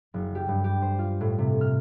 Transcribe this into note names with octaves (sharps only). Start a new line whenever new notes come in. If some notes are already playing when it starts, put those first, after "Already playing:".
F#1
G4
G2
G4
C5
F4
A2
C3
F6